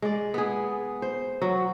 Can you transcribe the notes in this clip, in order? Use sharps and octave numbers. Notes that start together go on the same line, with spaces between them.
G#3 D5
B3 G#4
C5
F#3